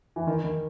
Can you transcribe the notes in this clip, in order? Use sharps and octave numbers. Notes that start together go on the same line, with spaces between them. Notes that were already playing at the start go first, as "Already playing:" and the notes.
E3
D#3
D#3